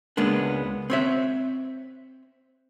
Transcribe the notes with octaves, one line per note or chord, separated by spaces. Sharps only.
C#2 G#3 A#3 B3 D4
C4 C#5 E5